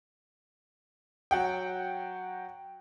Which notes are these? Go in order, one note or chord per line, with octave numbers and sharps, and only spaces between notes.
F#3 F#5 G5